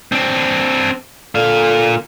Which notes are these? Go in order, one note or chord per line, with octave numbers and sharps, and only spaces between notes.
C4 D4
A#2 D3 F5